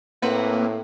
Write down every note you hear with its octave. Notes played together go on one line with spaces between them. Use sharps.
A2 A#3 C4 B4 F#5